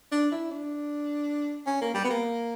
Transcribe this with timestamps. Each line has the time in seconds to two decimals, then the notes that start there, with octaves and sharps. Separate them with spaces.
0.12 D4
0.32 E4
0.51 D4
1.66 C#4
1.81 A#3
1.95 G3
2.04 B3
2.10 A#3